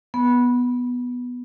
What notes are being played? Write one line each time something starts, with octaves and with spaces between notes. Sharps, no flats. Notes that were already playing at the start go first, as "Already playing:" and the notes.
B3